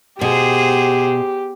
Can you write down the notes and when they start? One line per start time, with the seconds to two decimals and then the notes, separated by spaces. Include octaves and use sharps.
0.21 B2 G4 G#4 C5